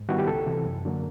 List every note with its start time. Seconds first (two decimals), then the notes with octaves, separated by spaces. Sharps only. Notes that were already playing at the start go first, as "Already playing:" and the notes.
Already playing: G#2
0.09 D#3 G3 B3 E4 F#4
0.18 G4
0.27 C#2 A4
0.46 C3 E3
0.65 F#2
0.85 D3 F#3 A#3